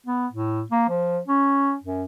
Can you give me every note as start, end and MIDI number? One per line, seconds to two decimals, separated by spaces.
0.06 0.27 59
0.32 0.63 45
0.71 0.86 58
0.89 1.18 53
1.28 1.75 61
1.83 2.04 42